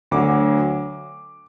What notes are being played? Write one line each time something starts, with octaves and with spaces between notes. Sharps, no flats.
D2 D3 F#3 D6